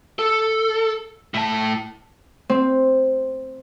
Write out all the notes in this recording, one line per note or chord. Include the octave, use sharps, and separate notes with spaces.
A4
A2 A5
C4